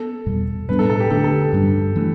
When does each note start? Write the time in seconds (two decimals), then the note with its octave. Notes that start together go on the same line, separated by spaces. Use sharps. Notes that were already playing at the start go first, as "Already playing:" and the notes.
Already playing: B3 A4
0.26 E2 B2 G3
0.69 A2 G3 B3 D4 B4
0.79 A4
0.90 A4
1.00 G4
1.10 D3 A3 D4 A4
1.24 A4
1.53 G2 G3 D4
1.96 E3 A3 D4